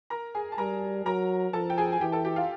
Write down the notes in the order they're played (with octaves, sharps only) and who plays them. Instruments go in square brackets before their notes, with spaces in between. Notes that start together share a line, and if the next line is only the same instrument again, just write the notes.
[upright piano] A#4 A#5
G#4 G#5
A5
[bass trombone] G3 [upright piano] A#4 A#5
[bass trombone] F#3 [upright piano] A#4 A#5
[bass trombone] F3 [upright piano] A4 A5
[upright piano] G5
G#4 G#5
G#5
[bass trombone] E3 [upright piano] G4 G5
[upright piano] A4 A5
G4 G5
F4 F5